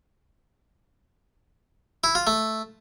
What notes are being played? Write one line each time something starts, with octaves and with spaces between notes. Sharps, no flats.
E4
F4
A3